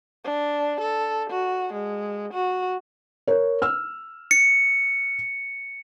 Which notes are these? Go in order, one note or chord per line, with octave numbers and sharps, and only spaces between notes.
D4
A4
F#4
G#3
F#4
A#4 C#5
E6 F6
C#7